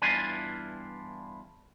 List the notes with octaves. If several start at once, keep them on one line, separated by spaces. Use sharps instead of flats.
E2 G2 D4 E4 F4 G#5